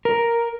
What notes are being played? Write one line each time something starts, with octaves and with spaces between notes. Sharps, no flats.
A#4